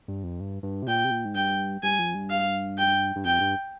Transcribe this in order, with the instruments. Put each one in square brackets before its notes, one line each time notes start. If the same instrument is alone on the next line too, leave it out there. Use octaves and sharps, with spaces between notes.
[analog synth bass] G2
F2
G2
G2
C3
[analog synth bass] A#2 [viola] G5
[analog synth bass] C3
A#2
G#2
[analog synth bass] G2 [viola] G5
[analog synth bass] G2 [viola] G#5
[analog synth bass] F2
G2
[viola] F5
G5
[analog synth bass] G2
[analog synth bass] F2 [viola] G5
[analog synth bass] G2